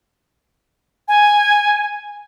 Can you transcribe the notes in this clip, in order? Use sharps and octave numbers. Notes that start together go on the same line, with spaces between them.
G#5